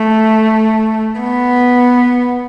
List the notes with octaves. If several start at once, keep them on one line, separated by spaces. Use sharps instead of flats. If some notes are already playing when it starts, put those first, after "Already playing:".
Already playing: A3
B3